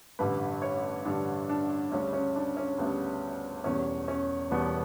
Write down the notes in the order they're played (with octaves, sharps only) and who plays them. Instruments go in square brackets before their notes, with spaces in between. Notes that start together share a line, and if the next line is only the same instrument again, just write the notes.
[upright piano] A1 G2 D3 G3 B4
C#5
A1 G2 D3 G3 D4
D4
D2 C#3 G3 C#4
C#4
D4
C#4
D2 C#3 G3 B3
E1 E2 B2 G3 C#4
C#4
E1 E2 B2 G3 B3